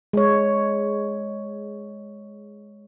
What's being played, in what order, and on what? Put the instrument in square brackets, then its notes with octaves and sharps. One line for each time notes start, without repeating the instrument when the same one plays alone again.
[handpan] G#3 C#5